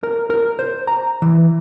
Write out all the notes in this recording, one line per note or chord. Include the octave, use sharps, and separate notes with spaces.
A#4
A#4
C5
A#5
E3